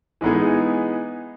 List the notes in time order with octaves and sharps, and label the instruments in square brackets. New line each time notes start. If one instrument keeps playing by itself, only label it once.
[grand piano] E3 G#3 B3 D#4 G#4